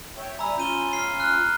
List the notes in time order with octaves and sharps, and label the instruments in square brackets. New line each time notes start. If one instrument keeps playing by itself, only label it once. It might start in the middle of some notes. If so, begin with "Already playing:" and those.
[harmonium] C#5 E5 G5
[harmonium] G3 E5 G#5 [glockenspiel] A#5 B5 E6
[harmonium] C#4 F4 [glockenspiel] G6 D#7 G7
[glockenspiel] F6 C7
F6 F#6